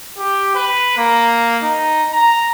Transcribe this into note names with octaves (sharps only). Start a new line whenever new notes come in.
G4
B4
A#3
D#4
A#5